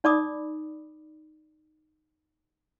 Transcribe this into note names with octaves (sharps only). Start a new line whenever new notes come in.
D#4 D5 B5 D6 D#6